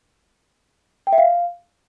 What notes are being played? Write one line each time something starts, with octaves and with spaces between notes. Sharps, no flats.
G5
E5
F5